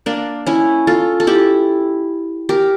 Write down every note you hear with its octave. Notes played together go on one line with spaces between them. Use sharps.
A#3 D4
C#4 E4
F4 A4
A4
E4 G4
G4 A#4